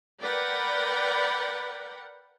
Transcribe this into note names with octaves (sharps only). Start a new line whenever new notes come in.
A#4 B4 D5 F#5 G5 B5